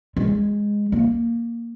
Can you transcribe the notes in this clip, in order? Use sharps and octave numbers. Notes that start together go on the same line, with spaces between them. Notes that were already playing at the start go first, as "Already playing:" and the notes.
G#3
A#3